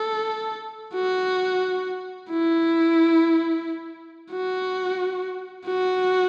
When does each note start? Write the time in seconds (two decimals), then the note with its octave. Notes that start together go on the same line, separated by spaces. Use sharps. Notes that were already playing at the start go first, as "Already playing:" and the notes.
Already playing: A4
0.94 F#4
2.30 E4
4.31 F#4
5.65 F#4